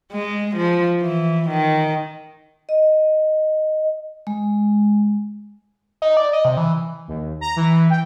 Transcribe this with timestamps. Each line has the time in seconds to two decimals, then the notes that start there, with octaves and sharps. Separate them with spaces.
0.12 G#3
0.56 F3
1.02 E3
1.50 D#3
2.69 D#5
4.27 G#3
6.02 D#4
6.17 D5
6.33 D#5
6.45 C3
6.57 E3
7.08 D#2
7.41 A#5
7.56 E3
7.90 G5